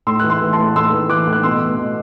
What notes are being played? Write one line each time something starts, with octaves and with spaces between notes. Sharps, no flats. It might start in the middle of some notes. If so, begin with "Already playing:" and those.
A2 C6 E6
E3 F#6
C6 E6
E3
A5 C6
A2
A2 C6 E6
E3
E3 D6 F#6
A2
F#6
B2 C6 E6
B2
B2